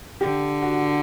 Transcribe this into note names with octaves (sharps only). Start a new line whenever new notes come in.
D3 G4
F#4